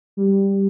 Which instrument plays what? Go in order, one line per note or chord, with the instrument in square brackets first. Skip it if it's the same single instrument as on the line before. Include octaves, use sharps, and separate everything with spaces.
[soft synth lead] G3